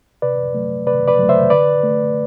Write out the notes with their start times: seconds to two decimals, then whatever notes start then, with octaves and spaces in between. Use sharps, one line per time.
0.22 C3 B4 D5
0.54 F#3 A3
0.87 C3 B4 D5
1.08 B4 D5
1.19 F#3 A3
1.29 C5 E5
1.50 D3 B4 D5
1.83 A3